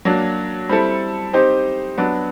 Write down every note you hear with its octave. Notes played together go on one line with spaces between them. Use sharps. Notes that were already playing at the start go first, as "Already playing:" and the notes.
F#3 A#3 D4
G3 C4 E4 A4
C4 D#4 G4 C5
F#3 B3 D4